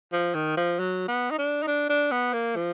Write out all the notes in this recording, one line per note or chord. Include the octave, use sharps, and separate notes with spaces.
F3
D#3
F3
F#3
B3
D#4
D4
D#4
D4
D4
B3
A#3
F3